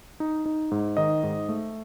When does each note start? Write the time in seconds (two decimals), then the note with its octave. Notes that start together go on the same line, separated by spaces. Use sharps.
0.20 D#4
0.46 D#4
0.71 G#2
0.97 D#3 D#5
1.23 G#2
1.49 A3